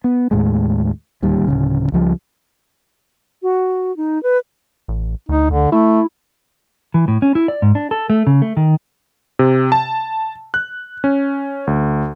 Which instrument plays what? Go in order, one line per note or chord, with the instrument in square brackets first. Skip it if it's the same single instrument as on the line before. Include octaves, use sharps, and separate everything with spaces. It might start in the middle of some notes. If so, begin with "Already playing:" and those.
[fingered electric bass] B3
D#2 A2 G#3
D1 D#2 G3
D1 A#1 C#3
C#2 F3 G3
[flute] F#4
D#4
B4
[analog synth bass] A1
[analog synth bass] D2 [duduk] D#4
[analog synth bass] D2 [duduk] D3
[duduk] A3 [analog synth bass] E4
[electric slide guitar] E3
A2
C#4
E4
D5
G#2
D4
A4
A3
C#3
A3
D#3
[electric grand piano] C3
A5
F#6
C#4
D2